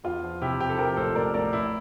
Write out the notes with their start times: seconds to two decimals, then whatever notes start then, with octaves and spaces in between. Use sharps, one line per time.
0.04 E2 F4
0.23 F3
0.41 C3 E4 G4
0.60 C3 G4
0.70 A4
0.78 F3 G4 A#4
0.96 A1 A4 C5
1.15 A1 A#4 D5
1.34 A1 A#4 D5
1.53 A1 E4